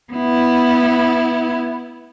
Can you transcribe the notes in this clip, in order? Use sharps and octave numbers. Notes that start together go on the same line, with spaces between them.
B3 E4